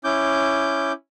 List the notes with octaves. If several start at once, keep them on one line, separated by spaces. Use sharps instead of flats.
C#4 E4 D6 G6